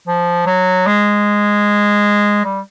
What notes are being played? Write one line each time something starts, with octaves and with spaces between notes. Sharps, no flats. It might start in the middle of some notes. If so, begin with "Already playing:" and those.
F3
F#3
G#3
G3